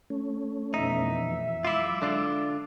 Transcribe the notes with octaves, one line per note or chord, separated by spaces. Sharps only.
A3 C#4
F2 B2 E3 D#4 E5
F#3 G#3 E4 F4 D6 E6
D3 D4 F4